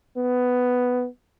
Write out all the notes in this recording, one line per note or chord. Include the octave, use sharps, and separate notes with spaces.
B3